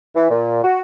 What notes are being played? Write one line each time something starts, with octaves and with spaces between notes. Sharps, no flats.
E3
A#2
F#4